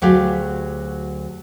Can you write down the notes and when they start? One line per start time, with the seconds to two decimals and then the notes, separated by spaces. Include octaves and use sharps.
0.02 D2 F#3 G4 G#4 F5